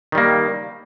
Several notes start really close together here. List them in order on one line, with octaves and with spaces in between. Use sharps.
D#3 G3 A#3